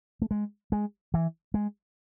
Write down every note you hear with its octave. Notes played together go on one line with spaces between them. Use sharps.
A3
G#3
G#3
E3
G#3